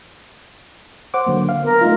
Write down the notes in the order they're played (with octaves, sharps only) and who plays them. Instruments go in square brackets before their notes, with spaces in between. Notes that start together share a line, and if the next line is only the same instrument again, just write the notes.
[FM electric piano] C5 F#5 D6
D3 F#3 A#3
F5
[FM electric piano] B3 [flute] A#4
[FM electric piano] A3 D#4 F4